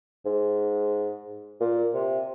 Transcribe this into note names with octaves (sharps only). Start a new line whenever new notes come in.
G#2
A#2
C3